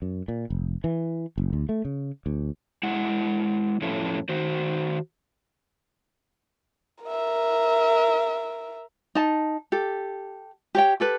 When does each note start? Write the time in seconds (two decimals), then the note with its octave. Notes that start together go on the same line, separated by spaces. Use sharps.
0.02 F#2
0.28 A#2
0.50 F1
0.84 E3
1.38 F#1
1.53 D2
1.69 A3
1.85 C#3
2.26 D2
2.83 G#3 E4 F#5
3.81 F2 A2 F3 C#4 E4 A4
4.29 D#3 F#4 C5
7.04 A#4 E5
9.15 D#4 A5
9.72 G4 A4
10.75 G4 C#5 G5
11.00 G4 A4 B4